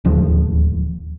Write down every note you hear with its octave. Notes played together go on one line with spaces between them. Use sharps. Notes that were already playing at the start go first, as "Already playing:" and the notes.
D1 D#2 F3